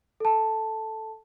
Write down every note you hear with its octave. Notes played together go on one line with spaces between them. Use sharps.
A4 A5